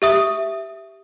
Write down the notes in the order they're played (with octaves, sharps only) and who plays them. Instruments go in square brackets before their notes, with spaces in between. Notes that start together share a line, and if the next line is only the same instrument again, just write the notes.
[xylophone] G4 E5 D#6